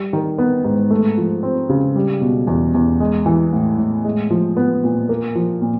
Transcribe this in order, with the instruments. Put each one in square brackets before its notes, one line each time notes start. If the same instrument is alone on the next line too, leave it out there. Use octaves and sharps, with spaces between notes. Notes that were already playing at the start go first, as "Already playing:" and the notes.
Already playing: [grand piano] G3
D#3
B3
G#2
A3
F3
C4
C#3
G3
B2
E2
E2
G#3
E3
A2
A2
G#3
F3
B3
A#2
A#3
F3
A#2